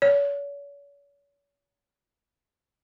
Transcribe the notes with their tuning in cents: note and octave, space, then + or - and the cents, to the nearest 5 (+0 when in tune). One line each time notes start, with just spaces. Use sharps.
C#5 +40